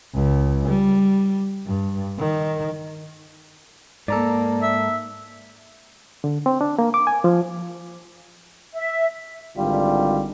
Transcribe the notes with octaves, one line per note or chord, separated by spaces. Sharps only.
C#2
G3
G2
D#3
G#2 A#3 A4 D5 A#5
E5
D3
C4
D4
A#3
D6
G#5
F3
E5
G#1 D3 G3 F4